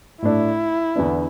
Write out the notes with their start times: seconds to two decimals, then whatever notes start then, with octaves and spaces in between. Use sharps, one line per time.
0.22 A2 A3 D4 E4
0.96 E2 D3 B3 D4